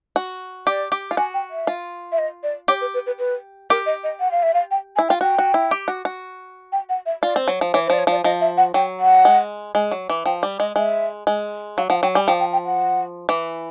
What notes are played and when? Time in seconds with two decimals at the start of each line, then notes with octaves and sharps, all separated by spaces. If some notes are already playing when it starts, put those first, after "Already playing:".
0.16 F#4
0.67 G4 D5
0.92 G4
1.11 F4
1.17 F#4 G#5
1.34 G5
1.51 E5
1.67 F4
2.12 E5
2.18 D#5
2.43 D5
2.68 G4 C#5
2.81 B4
2.94 B4
3.06 B4
3.19 B4
3.70 G4 A#4
3.86 D#5
4.04 D#5
4.20 F#5
4.31 F5
4.43 E5
4.54 F5
4.71 G5
4.96 G#5
4.99 E4
5.08 F4 G5
5.21 F#4 G5
5.39 F#4
5.54 E4
5.71 G4
5.88 F#4
6.05 F#4
6.72 G5
6.89 F#5
7.06 E5
7.23 F4 D5
7.36 C4
7.48 F#3
7.61 F3
7.74 E3 C#5
7.86 C5
7.90 F3 D5
7.99 C#5
8.07 F3 D5
8.24 F3 D#5
8.41 E5
8.57 F#5
8.74 F#3 G5
9.00 F#5
9.25 G#3
9.75 G#3
9.91 F#3
10.10 E3
10.26 F3 G5
10.43 G3
10.60 G#3 D#5
10.76 G#3 E5
11.27 G#3
11.77 F#3 F5
11.90 F3 F#5
12.02 F#3 G5
12.15 G3 G#5
12.28 F3 G5
12.40 G5
12.53 G5
12.66 F#5
13.29 E3